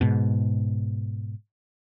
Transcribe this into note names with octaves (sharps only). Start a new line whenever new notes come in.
G#2 B2